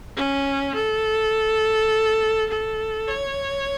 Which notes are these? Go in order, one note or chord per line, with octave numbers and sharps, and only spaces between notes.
C#4
A4
A4
C#5